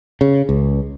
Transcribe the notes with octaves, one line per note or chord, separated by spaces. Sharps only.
C#3
C#2